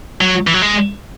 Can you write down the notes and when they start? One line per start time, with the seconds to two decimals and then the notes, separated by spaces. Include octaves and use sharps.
0.21 F#3
0.47 E3
0.54 F#3
0.62 G#3